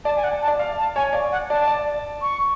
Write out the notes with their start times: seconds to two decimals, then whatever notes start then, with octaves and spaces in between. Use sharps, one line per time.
0.05 D5 A5
0.16 G#5
0.24 F#5
0.42 A5
0.48 D5
0.59 F5
0.78 A5
0.96 C#5 G#5
1.13 D5 F5
1.32 F#5
1.50 D5 A5
1.68 D5
2.22 C#6